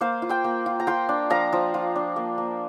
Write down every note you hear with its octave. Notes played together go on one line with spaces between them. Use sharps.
A#3 C5 F5
F4
G5 C6
A#3
F4
A#5
F4 G5 C6
D4
F3 F5 A#5
F3
F4
D4
A#3
A#3